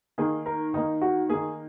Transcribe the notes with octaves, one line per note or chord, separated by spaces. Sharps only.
D#3 A#3 G#4
A#4
D#3 A#3 D#4
F#4
D#3 A#3 G#4